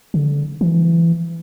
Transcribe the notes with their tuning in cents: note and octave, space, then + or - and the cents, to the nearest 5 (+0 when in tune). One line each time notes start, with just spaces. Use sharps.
D3 -25
E3 +25